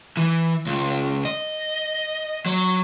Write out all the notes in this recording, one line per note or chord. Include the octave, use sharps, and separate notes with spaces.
E3
C#2
D#5
F#3